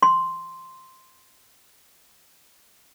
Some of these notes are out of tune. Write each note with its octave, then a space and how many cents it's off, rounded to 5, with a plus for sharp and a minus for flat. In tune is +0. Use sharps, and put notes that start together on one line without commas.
C6 +0